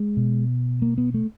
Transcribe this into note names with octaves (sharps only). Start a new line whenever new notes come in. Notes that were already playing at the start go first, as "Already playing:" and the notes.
Already playing: G#3
B2
A#3
B3
A3